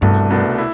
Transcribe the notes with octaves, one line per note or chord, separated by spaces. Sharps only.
C2 G2 B2 A3 D4
C2 B2 A3 D4
E4